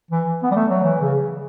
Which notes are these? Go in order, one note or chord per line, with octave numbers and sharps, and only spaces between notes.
E3
B3
G3
A3
F#3
E3
C#3